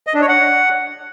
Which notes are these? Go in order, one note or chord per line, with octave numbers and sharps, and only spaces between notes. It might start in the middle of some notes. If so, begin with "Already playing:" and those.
D#5
D4
C#5
F#5